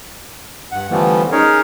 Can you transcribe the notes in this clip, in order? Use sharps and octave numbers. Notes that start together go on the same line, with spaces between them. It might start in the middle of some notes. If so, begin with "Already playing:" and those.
G2 F#5
D3 E3 F3 G3 A3 B3
C#4 D#4 G#4 A#4 C#5